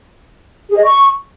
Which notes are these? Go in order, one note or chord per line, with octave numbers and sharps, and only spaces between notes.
G#4
D#5
C#6